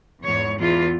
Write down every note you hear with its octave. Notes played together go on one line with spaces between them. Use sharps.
E2 G#2 C#5
E2 F4